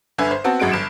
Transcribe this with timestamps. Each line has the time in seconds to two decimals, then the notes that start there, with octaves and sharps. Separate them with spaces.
0.18 G1 D3 B4 E5 G#5
0.31 C5
0.44 B3 C4 F#4 A5
0.60 G#1 F#2 G#3 F#4 D7
0.72 G1 E7